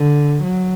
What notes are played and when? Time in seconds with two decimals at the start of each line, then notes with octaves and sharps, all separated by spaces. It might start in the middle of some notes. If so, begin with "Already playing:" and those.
Already playing: D3
0.44 F#3